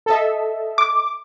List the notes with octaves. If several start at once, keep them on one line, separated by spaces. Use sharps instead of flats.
A4 D#5 E5
D6